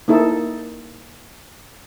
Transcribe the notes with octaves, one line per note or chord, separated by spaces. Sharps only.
A#3 D#4 E4 A4